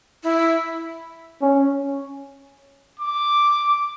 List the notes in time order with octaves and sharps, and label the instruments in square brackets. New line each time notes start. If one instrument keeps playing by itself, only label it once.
[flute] E4
[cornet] C#4
[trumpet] D6